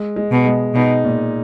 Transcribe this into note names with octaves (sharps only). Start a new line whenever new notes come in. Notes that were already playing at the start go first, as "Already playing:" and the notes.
Already playing: G#3
G#3
B2
G#3
B2 D#4
A#2